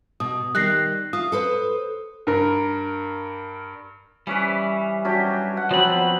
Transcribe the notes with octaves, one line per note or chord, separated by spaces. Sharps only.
B2 D#6
D#3 G3 F#6 A#6 C7
F4 D#6
A4 B4 C5
G2 A#4
E3 G3 C#4 B4
F#3 C#4 D4 G4
F#5
F3 F#3 B3 C4 B5